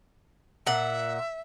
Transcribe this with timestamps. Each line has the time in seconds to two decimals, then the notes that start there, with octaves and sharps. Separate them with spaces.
0.67 A#2 E5 F#5